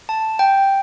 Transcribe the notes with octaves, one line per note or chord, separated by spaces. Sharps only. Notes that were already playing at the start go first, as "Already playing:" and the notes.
A5
G5